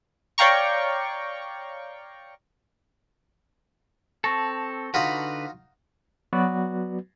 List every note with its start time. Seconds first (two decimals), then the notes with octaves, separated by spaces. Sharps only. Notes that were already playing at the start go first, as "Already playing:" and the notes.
0.38 C#5 D5 F5 G5 A#5 C#6
4.24 C4 A4 A5 C#6 A#6
4.94 D3 D#4 F4 F#4 B4
6.33 F#3 B3 F#4 B4 D5